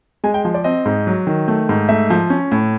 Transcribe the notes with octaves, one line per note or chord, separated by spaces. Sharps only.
G#3 G#5
G5
F3
D5
C4 D#5
G#2
F#3
D#3
A3
G#2
A3 E5
F3
C#4
A2